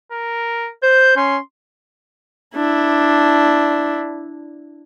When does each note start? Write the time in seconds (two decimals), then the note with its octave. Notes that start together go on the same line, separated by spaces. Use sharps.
0.12 A#4
0.83 C5 G6
1.16 C#4 C6
2.55 D4 E4